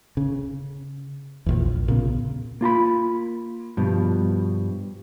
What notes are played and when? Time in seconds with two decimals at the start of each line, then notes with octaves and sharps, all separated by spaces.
0.17 C#3
1.46 A#1 E2
1.88 A#2 C#3 B3
2.61 A#3 F4 A#5 B5
3.77 G2 B2 F3